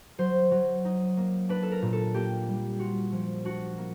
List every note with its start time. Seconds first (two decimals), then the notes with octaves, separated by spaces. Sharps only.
0.18 F#3 C5
0.51 F#3
0.85 D#4
1.17 A#3
1.49 D4 B4
1.63 A4
1.72 A#4
1.82 A#2
1.93 A4
2.14 A#3 G4
2.48 G3
2.79 F4 F#4
3.12 F3
3.45 D4 F#4
3.78 A#3